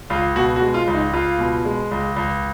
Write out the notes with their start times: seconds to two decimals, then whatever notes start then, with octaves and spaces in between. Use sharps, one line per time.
0.10 C#2 F4
0.36 B2 F#4
0.56 F#4
0.61 G#3
0.74 F4
0.87 C#2
0.94 D#4
1.13 C#2 F4
1.39 B2
1.65 G#3
1.91 C#2
2.16 C#2